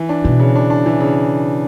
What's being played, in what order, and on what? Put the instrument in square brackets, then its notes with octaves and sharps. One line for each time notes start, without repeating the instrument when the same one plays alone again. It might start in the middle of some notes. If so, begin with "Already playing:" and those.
Already playing: [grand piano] E3
D4
[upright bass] B2 [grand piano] E3
[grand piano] C#3
D4
D4
E3
C#3